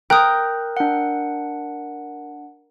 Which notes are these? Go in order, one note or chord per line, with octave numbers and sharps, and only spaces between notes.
A#4 G5 D#6 F#6 G6
D4 F#5